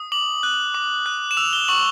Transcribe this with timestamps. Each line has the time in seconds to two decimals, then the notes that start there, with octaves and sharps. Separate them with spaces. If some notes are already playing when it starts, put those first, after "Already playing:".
Already playing: D#6
0.12 D6 F#7
0.43 F#6
0.74 D6
1.06 F#6
1.31 E7
1.37 E6 F7
1.53 G7
1.68 C#6 F#7